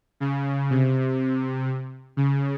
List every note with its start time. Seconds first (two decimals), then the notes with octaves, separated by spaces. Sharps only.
0.20 C#3
0.70 C3
2.17 C#3